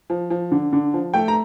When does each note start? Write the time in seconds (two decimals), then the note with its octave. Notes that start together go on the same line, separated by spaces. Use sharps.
0.10 F3
0.30 F3
0.51 D3
0.73 D3
0.94 F3
1.14 A3 G5
1.28 A#5